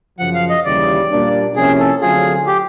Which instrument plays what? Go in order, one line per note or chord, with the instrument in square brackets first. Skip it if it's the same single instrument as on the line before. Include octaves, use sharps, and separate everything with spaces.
[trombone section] F#2 C#3 F3 [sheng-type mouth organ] F#5
[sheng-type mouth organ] F5
D#5
[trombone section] D#2 C#3 E3 G3 [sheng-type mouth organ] D5
[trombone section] A#2 G3 A#3 D4
[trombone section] C3 F3 A#3 C#4 E4 [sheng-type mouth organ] G#4
[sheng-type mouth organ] A4
[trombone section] D3 F#3 A3 C4 F4 [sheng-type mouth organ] G#4
[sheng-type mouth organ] G4